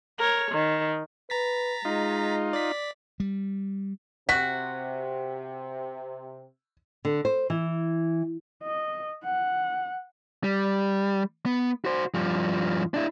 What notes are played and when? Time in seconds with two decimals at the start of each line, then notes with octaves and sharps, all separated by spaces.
0.18 A#4 C#5
0.52 D#3
1.30 B4 A#5 A6 B6
1.85 G#3 D#4 F4
2.53 D5 B6
3.20 G3
4.29 C3 F#4 B6
7.05 D3
7.25 C5
7.50 E3
8.63 D#5
9.25 F#5
10.44 G3
11.46 B3
11.85 F#4 C5
12.15 G2 F3
12.94 D4 E4